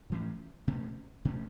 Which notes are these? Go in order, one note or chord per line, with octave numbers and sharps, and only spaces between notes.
A2 E3 A3 C#4
B2 A3 C#4
B2 A3 C#4